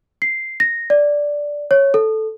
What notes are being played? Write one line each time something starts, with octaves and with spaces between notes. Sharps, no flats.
C7
A#6
D5
C#5
A4